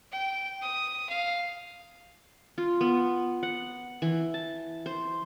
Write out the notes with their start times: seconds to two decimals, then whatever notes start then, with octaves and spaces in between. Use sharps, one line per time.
0.12 G5
0.62 D#6
1.09 F5
2.58 F4
2.81 B3
3.43 F#5
4.02 E3
4.34 A5
4.86 C5